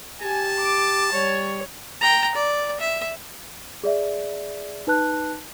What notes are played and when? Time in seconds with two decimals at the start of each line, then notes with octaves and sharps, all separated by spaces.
0.22 G4 G#5 A5
0.61 D6
1.13 G3 C#5
2.01 G5 A#5
2.35 D5
2.80 E5
3.84 G#4 D5 E5
4.87 D#4 B4 A5 F#6